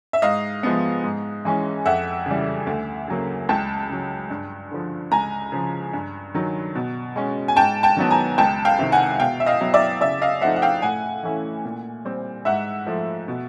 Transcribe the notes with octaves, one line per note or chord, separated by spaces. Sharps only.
E5
G#2 D#5 F5
F3 G#3 B3
G#2
E3 G#3 C#4
F2 E5 F#5
C#3 E3 G3
D2
C#3 F#3 A#3
C#2 G5 A5
C#3 F#3
G2
D3 F3
C#2 G#5 A#5
C#3 F3
G2
D#3 F#3
B2
G#3 C#4
G#5
G#2 G5 A5
G5 A5
D#3 F#3 B3
G#5 A#5
C#2 G5 A5
F5 G5
C3 D#3
F#5 G#5
B2 F5 G5
E5
D#5 F5
F#3 B3 E4
D5 E5
C#3 D5 E5
D#5 F5
F3 A3 C4 D#4 E5 F#5
F#5
F5 G5
A2 F#5 G#5
E3 A3 C#4 E4
A#2
G3 C4
G#2 E5 F#5
F3 A3
B2